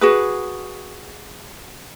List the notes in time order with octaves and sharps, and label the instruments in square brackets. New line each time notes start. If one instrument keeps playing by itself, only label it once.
[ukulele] F#4 G#4 B4